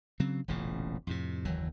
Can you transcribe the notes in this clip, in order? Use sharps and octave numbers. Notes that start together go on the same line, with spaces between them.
C#3 F#3 C4
E1 A1 A#2 C#3
F2 A2 C3
F#1 D#2 E3 F#3